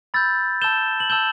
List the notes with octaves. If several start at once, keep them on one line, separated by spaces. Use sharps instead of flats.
B5 E6 G6 A6
A5 E6 G6 E7 G7
F#7
A5 E6 G6 E7 G7